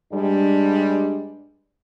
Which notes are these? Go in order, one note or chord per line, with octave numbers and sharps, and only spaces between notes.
G2 G3 G#3 D4